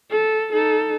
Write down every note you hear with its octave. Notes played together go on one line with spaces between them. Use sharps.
A4
D#4 A4